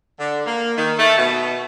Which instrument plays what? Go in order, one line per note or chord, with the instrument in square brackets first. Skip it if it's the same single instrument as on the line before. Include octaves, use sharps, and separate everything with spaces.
[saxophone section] D3
A#3
D#3
A3
B2